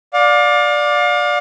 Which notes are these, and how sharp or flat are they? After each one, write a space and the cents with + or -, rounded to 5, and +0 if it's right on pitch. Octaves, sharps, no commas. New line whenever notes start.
D5 +0 F5 +35